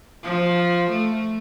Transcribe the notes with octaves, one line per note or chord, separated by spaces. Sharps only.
F3
A3